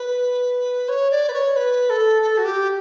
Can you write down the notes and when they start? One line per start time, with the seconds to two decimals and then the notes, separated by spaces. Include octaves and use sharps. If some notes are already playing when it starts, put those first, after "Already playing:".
Already playing: B4
0.89 C#5
1.11 D5
1.29 B4
1.33 C#5
1.56 B4
1.90 A4
2.22 A4
2.38 F#4
2.45 G4